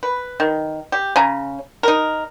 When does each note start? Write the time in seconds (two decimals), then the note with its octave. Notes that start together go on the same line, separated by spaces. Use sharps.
0.03 B4
0.40 D#3
0.92 G4
1.16 C#3 G#5 A#5
1.83 D#4 A#4